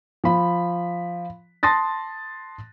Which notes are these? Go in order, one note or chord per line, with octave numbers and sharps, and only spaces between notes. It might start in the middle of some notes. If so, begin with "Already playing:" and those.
F3 B5
A5 C6 D#6 A6 A#6